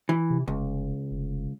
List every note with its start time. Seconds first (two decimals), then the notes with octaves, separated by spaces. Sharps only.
0.09 E3
0.30 C3
0.48 F1 C#2
1.11 F1